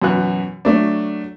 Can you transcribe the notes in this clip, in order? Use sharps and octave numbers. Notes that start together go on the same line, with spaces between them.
F#2 B2 E3 F#6
F#3 A3 D4